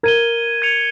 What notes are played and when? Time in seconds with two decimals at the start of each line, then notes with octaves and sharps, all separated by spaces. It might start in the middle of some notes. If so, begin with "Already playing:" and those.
0.03 A#4 G#6 D#7 G7
0.62 G#6 C#7 F7